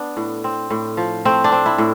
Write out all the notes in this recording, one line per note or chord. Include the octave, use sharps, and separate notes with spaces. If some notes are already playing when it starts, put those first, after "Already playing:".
Already playing: B3 D4
A2
C4
A2
F3
A3 C4
D4
C4
E4
A2